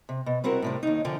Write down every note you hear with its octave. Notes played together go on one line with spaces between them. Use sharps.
C3
B2
G3 C4 E4 F#4 A#4
A2 C3 G3
D#2 D#4
D3 E3 F3 F4 G5